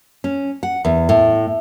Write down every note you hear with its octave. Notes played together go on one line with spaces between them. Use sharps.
C#4
F#5
E2
A2